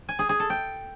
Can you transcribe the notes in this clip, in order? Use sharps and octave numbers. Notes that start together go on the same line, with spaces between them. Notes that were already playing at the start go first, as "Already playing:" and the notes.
G#5
G#4
G#4
A4
G5